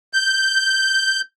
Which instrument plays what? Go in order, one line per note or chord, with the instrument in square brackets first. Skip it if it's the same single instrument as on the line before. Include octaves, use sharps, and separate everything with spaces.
[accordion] G6